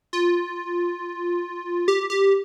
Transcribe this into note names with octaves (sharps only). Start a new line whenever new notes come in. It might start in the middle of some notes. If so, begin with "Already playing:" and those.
F4
G4
G4